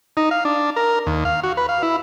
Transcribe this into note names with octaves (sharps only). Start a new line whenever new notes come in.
D#4
F5
D4
A#4
D#2
F5
F#4
B4
F5
E4